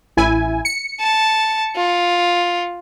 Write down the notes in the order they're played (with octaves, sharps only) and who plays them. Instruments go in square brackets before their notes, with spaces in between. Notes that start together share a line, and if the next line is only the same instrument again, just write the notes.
[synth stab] A1 E4 G#5
C#7
[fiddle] A5
F4